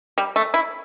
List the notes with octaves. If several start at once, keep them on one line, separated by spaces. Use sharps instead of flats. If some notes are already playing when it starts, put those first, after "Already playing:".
G3
A3
E4